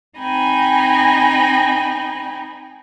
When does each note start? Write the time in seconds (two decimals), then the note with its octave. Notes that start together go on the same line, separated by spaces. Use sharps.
0.18 C4 D#4 D#5 G5 G#5 B5